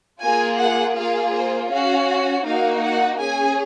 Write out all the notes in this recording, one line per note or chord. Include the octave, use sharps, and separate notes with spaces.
A#3 F4 G#4 G#5
F#5
A#3 F4 G#4 F5
C5
C#4 F#4 F5
A#3 D#4 F#4 F5
F#5
C#4 G#4 G#5